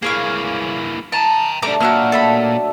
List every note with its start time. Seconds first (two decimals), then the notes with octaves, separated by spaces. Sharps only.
0.02 E3 A#3 G#4 C#5 F5
1.12 G5 A5 A#5
1.62 G3 A3 D4 C5 E5 A#5 D6
1.81 A#2 F#3 F#4 E5 F6
2.12 A3 A4 E5 B5